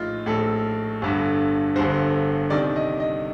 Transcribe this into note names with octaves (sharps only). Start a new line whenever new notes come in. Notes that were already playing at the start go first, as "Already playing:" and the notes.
Already playing: A#1 A2 D#4 F4
A#1 A2 A4
G1 G2 D3
G1 G2 D3 C5
C2 C3 D#3 D5
D#5
D#5